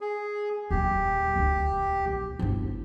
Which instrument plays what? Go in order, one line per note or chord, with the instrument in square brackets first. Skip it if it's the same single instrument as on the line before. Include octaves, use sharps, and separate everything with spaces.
[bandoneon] G#4
[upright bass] D#1 F#3 [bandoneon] G4
[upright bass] D#1 D2
B1
G1 E4